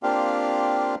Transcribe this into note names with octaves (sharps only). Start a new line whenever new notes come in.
A#3 C4 D4 F4 G4 F5